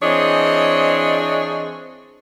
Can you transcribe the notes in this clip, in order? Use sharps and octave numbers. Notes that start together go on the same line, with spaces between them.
E3 C4 D4 G#4 C#5 D#5